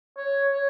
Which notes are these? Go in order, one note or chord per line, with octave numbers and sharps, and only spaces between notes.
C#5
C#5